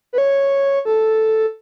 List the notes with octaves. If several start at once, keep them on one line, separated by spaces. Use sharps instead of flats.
B4
C#5
A4